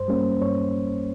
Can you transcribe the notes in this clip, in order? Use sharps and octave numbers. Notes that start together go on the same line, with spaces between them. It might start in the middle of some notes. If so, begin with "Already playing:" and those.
Already playing: G2 C5
G3 A#3 C#4
G2 C#5